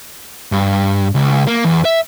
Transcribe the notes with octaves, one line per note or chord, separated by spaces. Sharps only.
G2
C#2
A#3
E2
E5